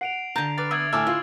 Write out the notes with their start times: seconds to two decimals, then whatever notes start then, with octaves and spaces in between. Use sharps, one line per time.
0.01 F#5 C7 D7 F7
0.36 D3 A5 A#5 G6
0.58 B4 D6 F6 A6
0.71 A3 B3 E6 G#6 F#7
0.93 A2 E5 G#5 D6 E6 F6
1.07 E4 F4